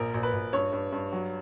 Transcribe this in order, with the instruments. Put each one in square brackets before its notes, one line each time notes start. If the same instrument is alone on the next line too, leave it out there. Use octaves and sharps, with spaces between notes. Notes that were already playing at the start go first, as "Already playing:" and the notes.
Already playing: [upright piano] A#1 A#4
A#1
B4
A#1
G2 C#5
G2
G2
F#3